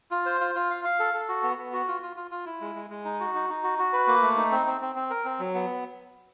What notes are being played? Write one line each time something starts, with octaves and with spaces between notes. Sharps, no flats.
F4
C5
F4
F4
F5
F5
A4
A4
F#4
B3
B3
F#4
F4
F4
F4
F4
E4
G#3
G#3
G#3
D#4
F#4
D#4
D#4
F#4
F#4
B4
A#3
A3
D#4
C4
C4
C4
C4
A#4
C4
F#3
B3